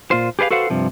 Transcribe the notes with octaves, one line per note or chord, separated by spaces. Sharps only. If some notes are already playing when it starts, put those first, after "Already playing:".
A#2 F4 C5
G4 G#4 B4 D5 F5
F#4 A4 B4 C5 F5 F#5
G2 C3 F3